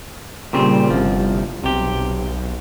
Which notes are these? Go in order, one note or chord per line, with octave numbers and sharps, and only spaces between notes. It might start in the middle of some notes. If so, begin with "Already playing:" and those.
A#2 C#3 G3 C4
G1 C2 F3
B1 C3 G4